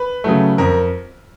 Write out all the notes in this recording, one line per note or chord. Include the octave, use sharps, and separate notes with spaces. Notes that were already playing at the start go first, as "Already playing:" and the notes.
Already playing: B4
C#3 F#3 A3
F2 A#4